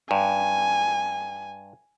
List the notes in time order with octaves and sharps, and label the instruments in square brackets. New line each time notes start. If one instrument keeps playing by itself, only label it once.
[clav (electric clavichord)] G2 [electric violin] G#5